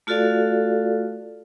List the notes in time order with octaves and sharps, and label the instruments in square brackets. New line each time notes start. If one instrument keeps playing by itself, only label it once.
[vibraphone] A3 F4 F#4 A4 D5 F5